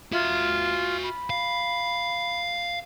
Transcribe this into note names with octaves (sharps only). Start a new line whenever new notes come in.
F4 F#4 E5
B5
F5